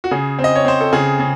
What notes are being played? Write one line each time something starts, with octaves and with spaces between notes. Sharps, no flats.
F#4
C#3 G#4
C4
D#5
C#5
C4 C5
A4
C#3 G#4
C#3